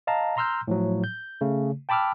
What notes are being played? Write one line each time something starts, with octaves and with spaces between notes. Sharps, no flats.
D#5 F5 A5 A#5
A#5 C6 E6 F6 G6
A2 F3 F#3
G6
C#3 A3
G5 A5 B5 D6 E6 F6